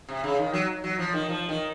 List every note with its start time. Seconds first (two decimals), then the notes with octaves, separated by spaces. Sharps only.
0.09 C3
0.24 C#3
0.38 D#3
0.53 F#3
0.84 F#3
0.99 F3
1.14 D#3
1.29 F3
1.49 D#3